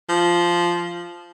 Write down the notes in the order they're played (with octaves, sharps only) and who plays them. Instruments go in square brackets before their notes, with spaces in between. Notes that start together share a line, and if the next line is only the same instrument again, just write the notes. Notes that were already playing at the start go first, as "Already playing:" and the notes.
[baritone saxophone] F3